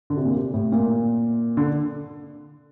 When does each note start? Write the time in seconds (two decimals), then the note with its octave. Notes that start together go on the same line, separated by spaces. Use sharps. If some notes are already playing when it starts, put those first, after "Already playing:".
0.10 D3
0.17 C3
0.25 A#2
0.36 C3
0.54 A2
0.72 A#2
1.57 D3